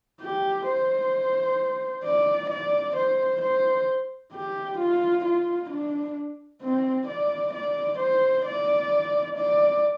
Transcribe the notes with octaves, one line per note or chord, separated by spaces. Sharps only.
G4
C5
D5
D5
C5
C5
G4
F4
F4
D4
C4
D5
D5
C5
D5
D5